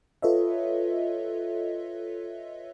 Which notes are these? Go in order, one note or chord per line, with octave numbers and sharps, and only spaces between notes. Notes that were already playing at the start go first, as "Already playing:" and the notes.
F4 A4 B4 C#5 D#5 E5